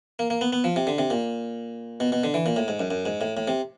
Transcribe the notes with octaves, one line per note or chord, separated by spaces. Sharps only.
A#3
A#3
B3
B3
F3
C3
D3
C3
A#2
B2
B2
D3
E3
A#2
A2
G#2
F#2
F#2
G#2
A2
A2
C3